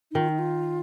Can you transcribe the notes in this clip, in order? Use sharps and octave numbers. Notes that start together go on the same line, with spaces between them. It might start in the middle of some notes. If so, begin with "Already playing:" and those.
D#4
D#3 F4
D#4
F4